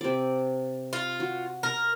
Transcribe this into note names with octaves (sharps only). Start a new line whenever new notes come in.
C3 D5
F4
F#4
A#4